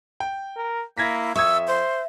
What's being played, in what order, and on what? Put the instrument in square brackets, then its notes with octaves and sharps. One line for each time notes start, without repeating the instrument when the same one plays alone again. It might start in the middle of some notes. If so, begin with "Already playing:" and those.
[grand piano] G5
[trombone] A#4
[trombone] A#3 [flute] E4 [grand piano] G#6 A#6 B6
[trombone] F2 [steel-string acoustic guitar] E5 [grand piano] C#6 D#6 G#6 [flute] E6
[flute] C5